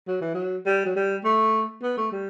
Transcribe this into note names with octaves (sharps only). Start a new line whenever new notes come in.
F#3
E3
F#3
G3
F#3
G3
A3
B3
A3
G3